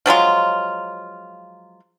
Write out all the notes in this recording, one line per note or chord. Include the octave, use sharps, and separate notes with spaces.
F3 F#3 G#3 F4